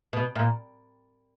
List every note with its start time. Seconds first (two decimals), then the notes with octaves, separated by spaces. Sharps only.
0.13 B2
0.35 A#2